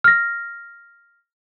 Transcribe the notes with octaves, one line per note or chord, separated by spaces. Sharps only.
F6 A#6